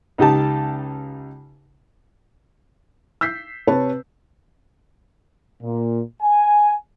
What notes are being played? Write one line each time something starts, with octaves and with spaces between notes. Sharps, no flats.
C#2 D#4 G4 A5
E6 G6 B6 C7
C3 B4 C#5 A5
A#2
G#5